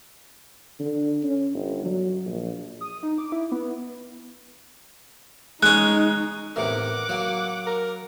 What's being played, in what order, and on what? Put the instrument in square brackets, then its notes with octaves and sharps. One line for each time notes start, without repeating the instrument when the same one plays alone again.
[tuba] D3
C#4
G1
F#3
A#1
[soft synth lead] D#6
D#4
D6
E4
B3
[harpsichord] G#3 C#4 [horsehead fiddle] D#4 [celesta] F#6
[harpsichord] E2 A2 C3 [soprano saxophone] A#4 [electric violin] F#5 D6
[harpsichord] F#3 A#3
[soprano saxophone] A#4